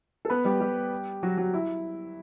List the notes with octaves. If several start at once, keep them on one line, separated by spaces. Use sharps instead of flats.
A4
B3 B4
G3 G4
G3 G4
F#3 F#4
F#3 F#4
E4